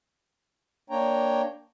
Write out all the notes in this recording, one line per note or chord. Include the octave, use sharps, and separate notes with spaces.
A#3 D4 C#5 G5 A#5